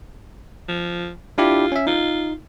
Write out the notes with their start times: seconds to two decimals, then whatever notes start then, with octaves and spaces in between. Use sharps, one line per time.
0.68 F3
1.38 D4 E4 F4 G4
1.72 C#4 E5
1.87 D#4 F4